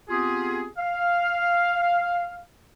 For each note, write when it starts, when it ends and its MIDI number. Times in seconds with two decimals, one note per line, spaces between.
0.09 0.66 59
0.09 0.66 60
0.09 0.66 65
0.09 0.66 67
0.09 0.66 68
0.78 2.41 77